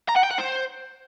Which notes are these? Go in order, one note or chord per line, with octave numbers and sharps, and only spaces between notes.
A#5
F#5
G5
F#5
C5